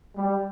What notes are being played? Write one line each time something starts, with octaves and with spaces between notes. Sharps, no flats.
G3